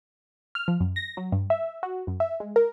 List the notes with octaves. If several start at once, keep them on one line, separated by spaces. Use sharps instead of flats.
F6
F3
F#2
A#6
F#3
G2
E5
F#4
F#2
E5
G#3
A#4